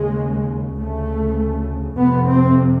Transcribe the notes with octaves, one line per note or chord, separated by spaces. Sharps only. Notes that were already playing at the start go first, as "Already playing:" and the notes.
Already playing: D#2 C#3 G#3
D2 C#3 A3
F2 C3 B3
C4